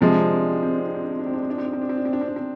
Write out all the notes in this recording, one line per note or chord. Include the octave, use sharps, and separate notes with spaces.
C3 F3 G#3 C4
D4
C4
D4
C4
D4
C4
D4
C4
D4
C4
D4
C4
D4
C4
D4
C4
D4
C4
D4
C4
D4
C4
D4
C4
D4
C4
D4
C4
D4
C4